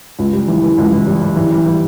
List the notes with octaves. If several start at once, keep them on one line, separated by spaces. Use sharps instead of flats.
C#2
G3
E3
E3
C#2
E3
G3
G3
E3
G3
E3